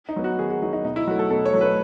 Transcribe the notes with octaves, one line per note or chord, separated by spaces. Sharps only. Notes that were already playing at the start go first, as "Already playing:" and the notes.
D#4
F#3 B3
F#4
D#3 G#4
F#4
F#3 B3 D#4
D#4
B2 D#4
E4
F#3 A3 F#4
A4
B2 A4
C#5
F#3 A3
B4